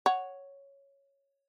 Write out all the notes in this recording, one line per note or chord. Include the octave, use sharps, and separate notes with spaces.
C#5 F#5